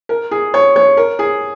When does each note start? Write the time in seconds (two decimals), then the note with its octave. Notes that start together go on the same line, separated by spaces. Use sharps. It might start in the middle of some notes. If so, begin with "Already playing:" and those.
0.09 A#4
0.31 G#4
0.54 C#5
0.76 C#5
0.97 A#4
1.19 G#4